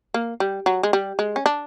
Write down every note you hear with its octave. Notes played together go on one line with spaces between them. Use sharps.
A#3
G3
F#3
G#3
G3
G#3
C#4
D4